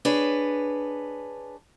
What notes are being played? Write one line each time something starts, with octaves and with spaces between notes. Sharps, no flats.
D4 G#4 B4 C#5